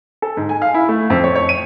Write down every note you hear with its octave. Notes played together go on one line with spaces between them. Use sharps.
A4
G#2
G#5
F5
E4
A3
F2
C#5
C#5
D#7